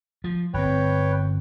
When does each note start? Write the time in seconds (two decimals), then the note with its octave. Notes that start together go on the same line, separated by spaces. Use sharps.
0.24 F3
0.54 G1 C4 B4 C#5 G5